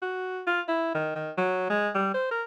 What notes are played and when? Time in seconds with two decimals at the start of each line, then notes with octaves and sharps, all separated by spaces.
0.02 F#4
0.47 F4
0.68 E4
0.95 D#3
1.15 D#3
1.38 F#3
1.70 G#3
1.95 G3
2.14 C5
2.31 A#4